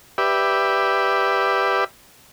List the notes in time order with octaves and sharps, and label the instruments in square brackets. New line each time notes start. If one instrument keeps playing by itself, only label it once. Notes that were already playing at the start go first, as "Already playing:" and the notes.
[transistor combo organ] G4 B4 D5 E5